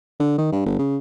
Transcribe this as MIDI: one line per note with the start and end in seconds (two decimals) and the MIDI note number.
0.20 0.34 50
0.38 0.48 51
0.52 0.62 43
0.65 0.78 31
0.79 0.97 49